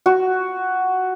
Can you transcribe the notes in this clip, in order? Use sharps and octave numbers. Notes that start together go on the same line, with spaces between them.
F#4